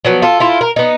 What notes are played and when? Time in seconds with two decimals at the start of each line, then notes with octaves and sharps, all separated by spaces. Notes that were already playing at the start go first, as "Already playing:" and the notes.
0.05 F3 F#3 B3
0.22 F4 A4
0.40 E4 F4 A4
0.61 A#4
0.76 B3 D#4